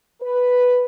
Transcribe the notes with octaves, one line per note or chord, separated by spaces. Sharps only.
B4